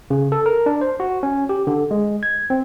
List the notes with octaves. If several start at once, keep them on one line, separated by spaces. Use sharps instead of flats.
C#3
A4
A#4
D4
C5
F#4
C#4
G4
D3
G#3
G#6
C4